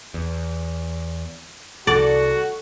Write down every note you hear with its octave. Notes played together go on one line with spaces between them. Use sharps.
E2
C2 F#4 A4 D5